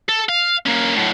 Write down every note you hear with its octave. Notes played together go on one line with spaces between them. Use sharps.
A4
F5
A#3 C#4
A2 F#3